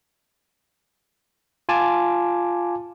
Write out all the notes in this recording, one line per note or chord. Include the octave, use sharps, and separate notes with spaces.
F4 G#5 A5 D6